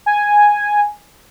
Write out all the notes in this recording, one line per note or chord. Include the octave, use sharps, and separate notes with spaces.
G#5